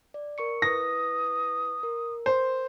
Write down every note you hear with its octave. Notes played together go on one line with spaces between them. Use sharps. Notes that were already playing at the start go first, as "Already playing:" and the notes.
D5
A#4 C#6 C#7
E4 B4 D#6 A#6
A#4
C5